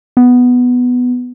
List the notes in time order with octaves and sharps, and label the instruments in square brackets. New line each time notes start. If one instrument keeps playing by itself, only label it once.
[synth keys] B3